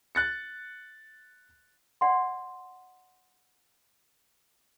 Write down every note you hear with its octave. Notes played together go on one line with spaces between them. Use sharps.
F#6 A6 C#7
D5 F#5 C6